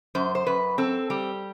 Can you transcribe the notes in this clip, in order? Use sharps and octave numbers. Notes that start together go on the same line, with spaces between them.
F#2 C5
C5
F#2 B4
C4 A4
G3 G4